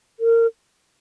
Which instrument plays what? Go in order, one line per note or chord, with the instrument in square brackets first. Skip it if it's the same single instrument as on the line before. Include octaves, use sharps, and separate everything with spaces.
[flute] A#4